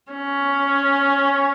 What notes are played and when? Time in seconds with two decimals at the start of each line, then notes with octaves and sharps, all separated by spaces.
0.12 C#4